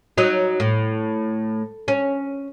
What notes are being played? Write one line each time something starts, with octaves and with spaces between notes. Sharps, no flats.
F#3 D#4
A2
C#4